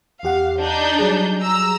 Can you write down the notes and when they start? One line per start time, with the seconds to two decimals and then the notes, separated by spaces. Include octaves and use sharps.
0.23 E2 G4 F5 F#5
0.61 D4 D#4 G6
0.99 F#3 G3 G#4
1.41 A#5 E6